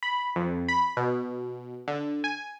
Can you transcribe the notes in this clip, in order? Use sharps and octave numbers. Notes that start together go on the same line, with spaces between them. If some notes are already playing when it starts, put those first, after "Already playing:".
B5
F2
B5
B2
D3
G#5